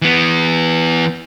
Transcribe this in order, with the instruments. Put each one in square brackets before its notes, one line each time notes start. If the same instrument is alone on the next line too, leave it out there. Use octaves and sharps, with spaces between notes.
[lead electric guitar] E3 B3